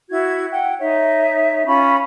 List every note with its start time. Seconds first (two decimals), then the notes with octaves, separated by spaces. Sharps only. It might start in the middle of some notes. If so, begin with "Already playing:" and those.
0.11 E4 F#4 G#6
0.50 F#5 G5
0.80 D#4 C#5 E5
1.66 C#4 F4 B5